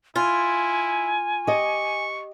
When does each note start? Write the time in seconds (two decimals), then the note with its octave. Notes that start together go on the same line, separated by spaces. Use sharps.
0.16 E4 F4 G#5
1.47 G4 D#5 C#6